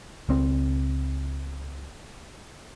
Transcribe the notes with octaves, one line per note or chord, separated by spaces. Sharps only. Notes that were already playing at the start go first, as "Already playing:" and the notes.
C#2 C4